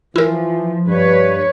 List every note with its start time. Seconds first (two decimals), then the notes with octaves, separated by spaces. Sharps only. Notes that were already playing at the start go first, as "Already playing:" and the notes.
0.16 E3 F3 E4 A#4
0.88 G2 B4 C#5